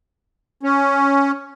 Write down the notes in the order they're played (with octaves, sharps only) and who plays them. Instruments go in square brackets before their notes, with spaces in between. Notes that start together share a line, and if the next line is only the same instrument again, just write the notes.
[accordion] C#4